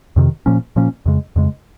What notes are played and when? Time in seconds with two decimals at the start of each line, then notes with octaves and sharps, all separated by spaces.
0.16 F2 C3 D#3
0.46 A#2 F3 A#3 C#4
0.76 A#2 F3 A#3 C#4
1.06 F2 C#3 G#3
1.36 F2 C#3 G#3